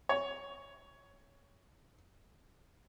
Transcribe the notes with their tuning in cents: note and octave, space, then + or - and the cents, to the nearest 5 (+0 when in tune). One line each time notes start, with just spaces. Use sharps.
C#5 +10